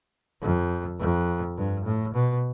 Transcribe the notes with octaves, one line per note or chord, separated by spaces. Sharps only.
F2
F2
G2
A2
B2